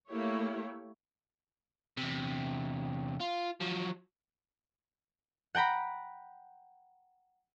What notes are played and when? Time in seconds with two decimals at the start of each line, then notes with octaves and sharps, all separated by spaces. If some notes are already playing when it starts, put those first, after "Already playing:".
0.10 A3 A#3 E4 G4 C#5
1.97 E2 C3
3.21 F4
3.61 F3 F#3
5.55 F#5 G5 A#5 B5